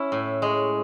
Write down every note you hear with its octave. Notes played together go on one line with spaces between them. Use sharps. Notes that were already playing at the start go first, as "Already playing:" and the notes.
Already playing: C#4 E4
A2
G#3